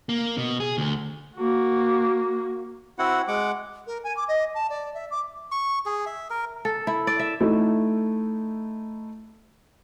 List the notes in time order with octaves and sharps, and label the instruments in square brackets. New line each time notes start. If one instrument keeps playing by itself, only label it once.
[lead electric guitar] A#3
B2
G#4
D2
[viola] A#3 F#4
[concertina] C4 E4 F#4 F#5
G#3 F#5 D6
[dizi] A#4
G#5
D6
D#5
A5
D5
E5
D6
[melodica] C#6
G#4
E5
A#4
[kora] A4
E4
D5
E5
[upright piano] A3 D#4 E4